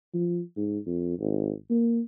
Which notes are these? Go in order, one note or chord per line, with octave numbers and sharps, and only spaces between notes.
F3
G#2
F2
G#1
A#3